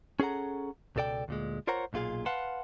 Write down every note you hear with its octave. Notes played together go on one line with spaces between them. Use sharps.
C#4 G#4 A4 F#5 A#5
C#2 B2 A4 D5 G5
D2 A#2 G#3
F4 A#4 C5 C#5 F#5 A#5
B1 A#2 F4 G#4 F5
B4 F5 F#5 A5 C6